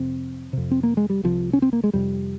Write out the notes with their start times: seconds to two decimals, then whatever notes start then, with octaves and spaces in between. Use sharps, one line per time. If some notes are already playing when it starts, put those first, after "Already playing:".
Already playing: F2 C3 C4
0.53 F2 C3
0.71 C4
0.83 A#3
0.97 G#3
1.10 G3
1.23 C2 C3 F3
1.53 C#4
1.62 C4
1.73 A#3
1.84 G#3
1.93 F2 C3 G3